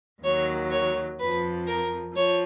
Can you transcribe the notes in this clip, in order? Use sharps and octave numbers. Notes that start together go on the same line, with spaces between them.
D#2 D#3 F#3 C#5
C#5
F2 F3 B4
A#4
F3 C#5